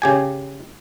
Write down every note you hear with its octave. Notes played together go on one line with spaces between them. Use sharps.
C#3 G4 G#5